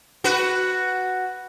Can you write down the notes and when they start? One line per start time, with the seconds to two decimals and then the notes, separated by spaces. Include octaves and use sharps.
0.24 F#4 B4